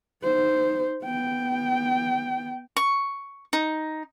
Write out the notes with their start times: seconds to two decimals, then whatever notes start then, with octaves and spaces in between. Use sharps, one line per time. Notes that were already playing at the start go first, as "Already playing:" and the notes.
0.23 D#4 C5
1.05 B3 G5
2.77 C#6
3.53 D#4